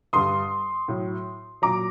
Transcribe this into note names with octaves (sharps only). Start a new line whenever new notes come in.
G2 D3 G3 C6 D#6
A2 F#3
A#2 F#3 A#5 D6